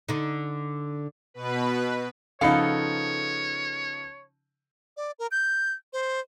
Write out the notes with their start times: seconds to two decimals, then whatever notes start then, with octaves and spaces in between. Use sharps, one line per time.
0.09 D3 D#4
1.34 B2 B4
2.41 C#3 F3 B3 D#4 A4 C#5 F5
4.97 D5
5.19 A#4
5.31 G6
5.93 C5